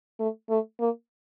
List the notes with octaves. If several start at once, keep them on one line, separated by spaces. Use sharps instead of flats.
A3
A3
A#3